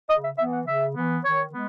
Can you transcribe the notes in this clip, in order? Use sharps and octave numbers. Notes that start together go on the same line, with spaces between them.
C#3 D#5
E5
E3 B3 E5
F#5
C#3 E5
E3 B3
D#3 C#5
G#3 B3